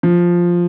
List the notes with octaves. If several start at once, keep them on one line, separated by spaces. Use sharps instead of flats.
F3